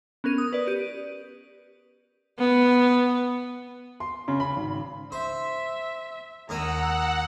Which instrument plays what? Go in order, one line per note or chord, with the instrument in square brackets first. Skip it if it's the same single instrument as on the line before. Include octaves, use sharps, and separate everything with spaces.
[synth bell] B3 C#4 A#4 D#7
D#6
B4 D5
G4 D#7
[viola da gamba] B3
[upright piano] C6
C#3
B5
G#1
[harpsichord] C5 [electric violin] E5
[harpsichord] D#2 A#3 D#5 [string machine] F#5 [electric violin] A#5 E6